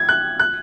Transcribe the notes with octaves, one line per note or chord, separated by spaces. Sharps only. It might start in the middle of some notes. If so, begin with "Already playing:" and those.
Already playing: G#6
F#6
F#6